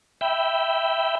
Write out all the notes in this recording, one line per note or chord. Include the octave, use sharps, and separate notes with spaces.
E5 G5 B5